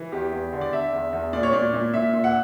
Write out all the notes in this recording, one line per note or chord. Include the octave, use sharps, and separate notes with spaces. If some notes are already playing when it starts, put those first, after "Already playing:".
Already playing: E3
E2 G4
E2
D3
D5
D3 E5
E2
E2
A#2 D5
C#5
A#2 D5
A#2
A#2 E5
A#2
F#5